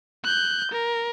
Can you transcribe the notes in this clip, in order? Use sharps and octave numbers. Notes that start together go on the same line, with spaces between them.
F#6 G6
A#4